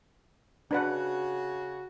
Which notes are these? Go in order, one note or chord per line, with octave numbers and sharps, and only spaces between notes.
C#3 D4 F#4 B4 F#5